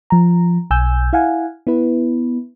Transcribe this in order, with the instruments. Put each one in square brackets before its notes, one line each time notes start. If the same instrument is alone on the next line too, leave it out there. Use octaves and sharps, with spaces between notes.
[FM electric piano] F3 A#5
B1 G#5 E6 G6
E4 F5 F#5 G#5
B3 E4 B4